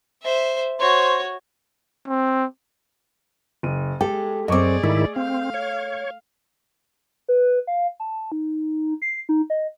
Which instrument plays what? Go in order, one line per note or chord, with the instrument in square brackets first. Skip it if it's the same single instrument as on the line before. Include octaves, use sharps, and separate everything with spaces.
[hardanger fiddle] C5 E5
[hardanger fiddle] F#4 C#5 [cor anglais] C5
[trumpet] C4
[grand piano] F#1 D#7
[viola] G#3 [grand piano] G4 [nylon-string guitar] A4
[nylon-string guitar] F#2 C4 [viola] G#4 D5 [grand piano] D#5 C#6 D6
[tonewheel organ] G#2 D#3 E4 [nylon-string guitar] A3
[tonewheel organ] C4 [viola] F5
[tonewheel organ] C#5
[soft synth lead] B4
F5
A5
D#4
C7
D#4
D#5